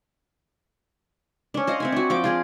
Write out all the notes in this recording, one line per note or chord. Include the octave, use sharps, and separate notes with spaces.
C#4 D4
C5 D#5 F5 F#5
C4 E5 G#5
D4 F#4
F3 G5 D6
F4 G#4 D5